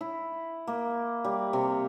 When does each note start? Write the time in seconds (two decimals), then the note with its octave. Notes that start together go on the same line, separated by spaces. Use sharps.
0.01 E4
0.67 A#3
1.24 G3
1.53 C3